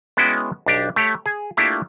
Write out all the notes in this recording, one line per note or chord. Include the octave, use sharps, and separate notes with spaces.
G#3 B3 C#4 E4 F#4 G5
B1 D4 G4
A3 G4 C#5
G#4
A3 A#3 D4 E4 F4 G4